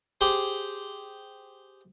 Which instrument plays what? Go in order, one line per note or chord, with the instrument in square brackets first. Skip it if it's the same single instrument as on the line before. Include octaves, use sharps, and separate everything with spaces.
[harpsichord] G4 G#4 C5